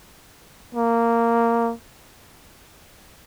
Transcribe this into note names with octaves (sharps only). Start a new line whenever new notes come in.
A#3